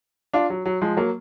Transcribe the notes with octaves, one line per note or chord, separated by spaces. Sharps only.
D4 F4
F#3
F#3
F3 G#3
F#3 A#3